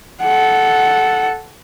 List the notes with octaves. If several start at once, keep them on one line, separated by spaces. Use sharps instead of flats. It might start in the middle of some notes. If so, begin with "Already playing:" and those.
A4 F#5